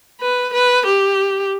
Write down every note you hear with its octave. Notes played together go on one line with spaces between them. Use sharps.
B4
B4
G4